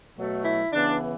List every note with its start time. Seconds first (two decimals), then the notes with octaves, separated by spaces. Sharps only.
0.16 B2 F#3 A3
0.44 E4
0.72 C#3 E3 B3 D4